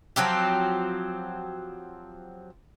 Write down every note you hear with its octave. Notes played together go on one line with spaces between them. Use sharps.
F3 F#3 C4 G4